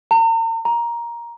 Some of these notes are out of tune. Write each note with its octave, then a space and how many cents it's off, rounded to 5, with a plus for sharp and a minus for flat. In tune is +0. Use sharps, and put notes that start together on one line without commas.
A#5 -45
A#5 +10